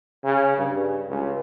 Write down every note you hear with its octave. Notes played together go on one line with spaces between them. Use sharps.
C#3
G2
C#2